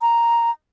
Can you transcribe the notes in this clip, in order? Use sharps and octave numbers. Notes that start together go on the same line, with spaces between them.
A#5